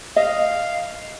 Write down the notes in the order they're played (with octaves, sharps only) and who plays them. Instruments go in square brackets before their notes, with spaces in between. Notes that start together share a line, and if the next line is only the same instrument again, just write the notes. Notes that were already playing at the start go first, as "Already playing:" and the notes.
[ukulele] D#5 [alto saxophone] F5